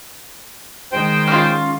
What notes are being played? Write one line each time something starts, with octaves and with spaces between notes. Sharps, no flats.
D#3 G#3 C5 G5
C#4 F4